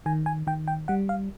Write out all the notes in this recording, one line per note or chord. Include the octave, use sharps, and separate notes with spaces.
D#3 G#5
G#5
D#3 G5
G5
G3 F#5
F5